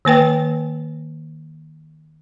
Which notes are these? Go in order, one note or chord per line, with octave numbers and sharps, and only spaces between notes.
D#3 A#3 B4 G5